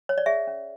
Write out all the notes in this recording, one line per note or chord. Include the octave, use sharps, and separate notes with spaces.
C#5
D5
G#4 E5
C#4